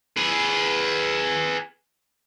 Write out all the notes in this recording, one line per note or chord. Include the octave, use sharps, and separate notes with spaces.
G#4 B4